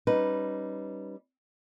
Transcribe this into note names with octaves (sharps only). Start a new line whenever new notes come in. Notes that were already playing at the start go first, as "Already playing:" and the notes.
G3 C#4 D#4 B4